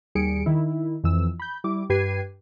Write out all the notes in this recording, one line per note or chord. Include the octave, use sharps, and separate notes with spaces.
D#2 G3 G#4 C#7 D7
D#3 E4
F2 E3 E6
B5 G6
G3 E4 D6
G2 G4 B4 G#6 C7 D#7